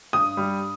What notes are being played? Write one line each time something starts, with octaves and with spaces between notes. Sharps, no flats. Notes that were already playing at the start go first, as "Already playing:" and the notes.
G2 D#6
G3